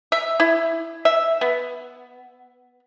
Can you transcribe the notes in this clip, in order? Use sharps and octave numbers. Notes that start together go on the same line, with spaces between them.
E5
E4
E5
B3